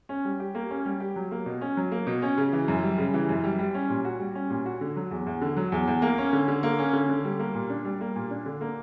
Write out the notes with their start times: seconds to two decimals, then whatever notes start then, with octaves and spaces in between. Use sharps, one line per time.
0.09 C#4
0.25 G3
0.40 G4
0.55 A#3
0.70 C#4
0.85 G3
1.00 G4
1.16 F#3
1.31 A#3
1.46 B2
1.61 C#4
1.77 F#3
1.92 A#3
2.07 B2
2.22 C#4
2.38 C#3
2.53 E3
2.68 F#2
2.83 G3
2.98 C#3
3.14 E3
3.29 F#2
3.44 G3
3.59 G3
3.74 C#4
3.90 A#2
4.05 F#4
4.19 G3
4.35 C#4
4.50 A#2
4.66 F#4
4.81 D3
4.96 F#3
5.11 E2
5.26 E2
5.41 D3
5.57 F#3
5.72 E2
5.88 E2
6.02 A#3
6.18 C#4
6.33 D3
6.48 D3
6.63 A#3
6.79 C#4
6.93 D3
7.09 D3
7.24 G3
7.39 A#3
7.55 A#2
7.70 D4
7.85 G3
8.01 A#3
8.16 A#2
8.31 D4
8.46 D3
8.61 A#3